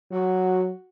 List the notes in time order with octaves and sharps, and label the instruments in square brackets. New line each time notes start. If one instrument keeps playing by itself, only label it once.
[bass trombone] F#3 [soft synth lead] F#4